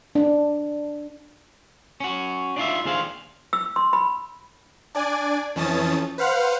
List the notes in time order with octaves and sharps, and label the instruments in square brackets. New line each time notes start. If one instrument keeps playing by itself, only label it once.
[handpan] D4
[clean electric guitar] C#4 F#4
D4 D#4 F4 E5
D#2 D4 G#4 C5 F5
[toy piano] E6
C6
B5
[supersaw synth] D4 D5 G#5
F2 E3 C#4 A5 D#6 A6
B4 C5 F5 F#5 F6